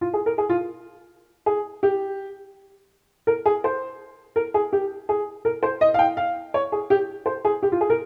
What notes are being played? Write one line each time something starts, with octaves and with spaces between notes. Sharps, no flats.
F4
G#4
A#4
G#4
F4
G#4
G4
A#4
G#4
C5
A#4
G#4
G4
G#4
A#4
C5
D#5
F5
G5
F5
C#5
G#4
G4
C5
G#4
G4
F4
G#4
A#4